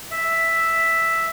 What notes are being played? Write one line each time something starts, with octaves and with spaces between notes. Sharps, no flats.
E5